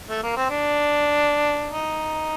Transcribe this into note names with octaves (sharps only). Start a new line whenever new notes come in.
A3
A#3
C4
D4
D#4